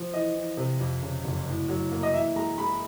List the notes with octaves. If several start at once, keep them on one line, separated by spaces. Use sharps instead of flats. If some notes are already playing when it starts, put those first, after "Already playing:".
Already playing: F3
E3 D#5
E3
C3
F2
C#3
F#1
A2
F#3
A#3
D#5
E3 E5
G#3 A#5
G#3 B5